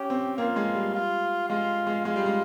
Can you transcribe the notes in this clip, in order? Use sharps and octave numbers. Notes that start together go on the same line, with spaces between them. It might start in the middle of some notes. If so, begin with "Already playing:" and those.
Already playing: C#4 G4
C4
A#3 F4
G#3
G3
F4
G#3 F4
G#3
G#3 F4
G3
G#3